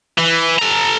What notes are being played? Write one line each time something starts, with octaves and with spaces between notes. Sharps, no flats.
E3
A4 A#5